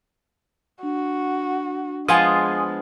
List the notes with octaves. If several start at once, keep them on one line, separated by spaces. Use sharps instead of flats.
D4 F#4
F3 G#3 B3 F4 G#5 C6 D#6